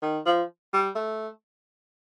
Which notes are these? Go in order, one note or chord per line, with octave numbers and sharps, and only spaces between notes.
D#3
F3
G3
A3